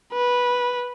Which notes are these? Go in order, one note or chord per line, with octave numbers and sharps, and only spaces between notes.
B4